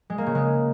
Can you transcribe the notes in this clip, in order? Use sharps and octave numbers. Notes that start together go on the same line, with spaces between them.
G#3
A#3
C#3
G#3